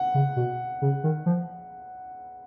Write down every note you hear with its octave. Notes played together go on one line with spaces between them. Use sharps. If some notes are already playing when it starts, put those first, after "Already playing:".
Already playing: F#5
C#3
B2
C#3
D#3
F3